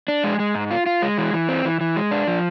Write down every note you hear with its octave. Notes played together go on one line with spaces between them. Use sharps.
D4
G#3
G#3
G#2
F4
F4
G#3
E3
E3
C4
E3
E3
G#3
D4
F3